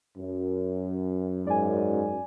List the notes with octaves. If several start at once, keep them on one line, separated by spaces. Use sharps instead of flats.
F#2
G#2 D5 G#5